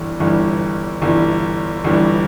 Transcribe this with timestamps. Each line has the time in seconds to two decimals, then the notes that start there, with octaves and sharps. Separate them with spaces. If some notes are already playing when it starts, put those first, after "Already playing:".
Already playing: G1 G2 E3
0.20 G1 G2 E3
1.02 G1 G2 E3
1.84 G1 G2 E3